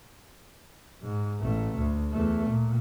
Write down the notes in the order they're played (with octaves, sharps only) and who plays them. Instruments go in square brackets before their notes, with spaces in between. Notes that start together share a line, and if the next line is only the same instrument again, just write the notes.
[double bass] G#2
A1 A3
D2
E2 A3
A#2